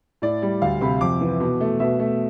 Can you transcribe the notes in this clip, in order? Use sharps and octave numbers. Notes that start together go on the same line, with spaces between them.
A2 D5
G3
D2 F5
C3 B5
F2 D6
E3
B2
A3
B2 E5
A3